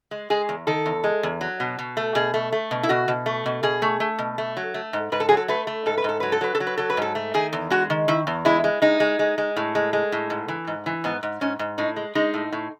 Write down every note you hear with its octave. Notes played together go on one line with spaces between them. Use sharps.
G#3
G#3 G#4
E2
D#3 A4
E2
G#3
E2
F#3
B2
B2
A3
B2 G#4
A3
A3
B2
E4
B2 F#4
B2
A3
B2
B2 G#4
A3
A3
B2
A3
F#3
A3
G#2
G#2 B4
A4
F#3 G#4
A4
A3 B4
A3
G#2 A4
B4
G#2 A4
F#3 B4
A4
F#3 B4
A4
F#3
B4
F#3 A4
B4
G#2 A4
A3
D#3 G#4
E2
G#3 F#4
D#3
D#3 E4
E2
G#3 E4
G#3
G#3 D#4
G#3
G#3
G#3
A2
G#3
G#3
A2
G#2
E3
G#2
E3
G#2 B3
G#2
G#2 C#4
G#2
A2 D#4
G#3
G#3 D#4
A2
A2